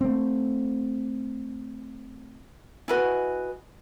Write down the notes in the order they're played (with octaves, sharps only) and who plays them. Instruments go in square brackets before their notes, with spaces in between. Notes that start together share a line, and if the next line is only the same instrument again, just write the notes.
[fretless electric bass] A3 C4
[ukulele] E4 B4 [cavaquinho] F#4 D#5 G#5